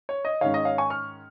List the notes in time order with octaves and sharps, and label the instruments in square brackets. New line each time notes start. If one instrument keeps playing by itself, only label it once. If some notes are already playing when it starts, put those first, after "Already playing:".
[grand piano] C#5
D#5
G#2 D#3 C#4 C#5 F5
D#5
C#5 F5
G#5 C#6
C#6 F6